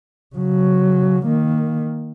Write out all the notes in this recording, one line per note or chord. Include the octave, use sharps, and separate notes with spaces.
C#3 F#3
D#3 A#3